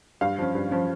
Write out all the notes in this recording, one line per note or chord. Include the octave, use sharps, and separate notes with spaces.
G2 F5
F3 C#4
G2
F3 C#4